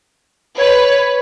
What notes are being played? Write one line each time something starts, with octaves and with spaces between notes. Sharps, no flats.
B4 C#5